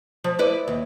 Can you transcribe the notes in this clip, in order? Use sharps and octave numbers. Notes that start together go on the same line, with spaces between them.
F3
E4 B4 D5
D#2